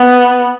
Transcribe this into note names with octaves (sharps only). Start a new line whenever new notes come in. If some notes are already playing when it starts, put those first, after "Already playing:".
Already playing: B3